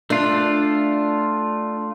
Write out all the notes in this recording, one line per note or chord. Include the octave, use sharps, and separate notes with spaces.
A3 D4 F4